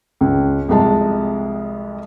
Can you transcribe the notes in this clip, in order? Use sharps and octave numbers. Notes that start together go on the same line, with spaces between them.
C#2
C2 F2 G#3 A5